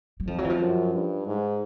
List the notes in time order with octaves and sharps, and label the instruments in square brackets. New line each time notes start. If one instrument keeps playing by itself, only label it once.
[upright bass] F#3
[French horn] F2 [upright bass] F3
[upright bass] F#3
E3
F3
[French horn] F#2
G2
G#2